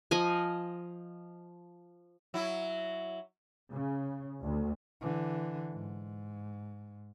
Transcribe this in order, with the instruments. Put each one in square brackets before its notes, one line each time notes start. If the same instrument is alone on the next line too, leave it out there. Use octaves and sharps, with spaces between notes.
[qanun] F3 D#5 G#5
[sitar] F#3 E4
[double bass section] C#3
D2
[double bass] D3 E3
G#2